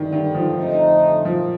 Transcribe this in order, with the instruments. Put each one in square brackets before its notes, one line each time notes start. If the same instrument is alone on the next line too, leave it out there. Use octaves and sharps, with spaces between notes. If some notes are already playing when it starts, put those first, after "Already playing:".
Already playing: [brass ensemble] G2 D3 G3 [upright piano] D#3
[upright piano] D#3
F3
[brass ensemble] F2 D3 A3 C4 D#4
[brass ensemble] A#2 [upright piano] F3